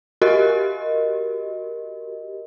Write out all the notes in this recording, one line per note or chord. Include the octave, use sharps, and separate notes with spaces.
F#4 G4 A#4 D#5